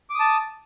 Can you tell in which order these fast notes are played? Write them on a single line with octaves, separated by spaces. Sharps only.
D6 D#6 A5